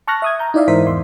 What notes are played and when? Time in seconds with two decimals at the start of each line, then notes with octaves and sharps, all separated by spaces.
0.07 A5 C#6 F6 F#6 A#6
0.22 E5 D#6 G#6
0.39 A#5 G6
0.54 D#4 E4 D5 E5 F5
0.68 G#2 E3 A#4 C5 E5 B6
0.87 E2 C6